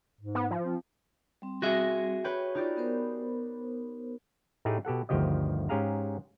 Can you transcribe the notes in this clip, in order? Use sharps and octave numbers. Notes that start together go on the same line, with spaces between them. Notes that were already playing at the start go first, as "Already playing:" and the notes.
G#2
B3
F3
C4
G3 C4
F#4 G#4 E5 F#6 A#6
B4 C#5 G5
D#4 F4 G4 D5
B3 A#4 C5
A2 A3 D#4 G4 G#4
B2 G4 A4 F#5
G1 D2 D#3 F3 G4 D#5
G#2 C#4 G4 G#4 F5 A#5